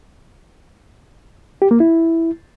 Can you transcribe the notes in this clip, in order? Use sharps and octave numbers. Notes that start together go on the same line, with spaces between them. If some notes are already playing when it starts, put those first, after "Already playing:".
G4
A#3
E4